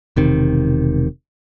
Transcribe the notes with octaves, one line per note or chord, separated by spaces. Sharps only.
E1 C3 D#3